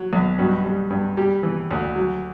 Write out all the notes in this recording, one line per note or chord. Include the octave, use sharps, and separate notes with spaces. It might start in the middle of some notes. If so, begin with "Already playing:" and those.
Already playing: F#3
B1
G2 F#4
G3
G2
G3 G4
E3
D2
F#3